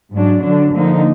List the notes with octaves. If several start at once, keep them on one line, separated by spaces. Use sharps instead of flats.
G#2 F#3 D4
D3 F#3 D4
D3 F3 A#3 D#4